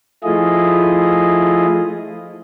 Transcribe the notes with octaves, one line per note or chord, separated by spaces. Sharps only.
F3 A3 E4 F4 G#4 D#5